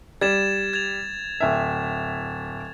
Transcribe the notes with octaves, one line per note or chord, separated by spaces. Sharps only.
G3 G#6 A6 E7
G#6 A6 F7
D1 E5